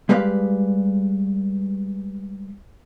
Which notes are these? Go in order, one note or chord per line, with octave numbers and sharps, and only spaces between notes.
G3 G#3 G4 B4 F5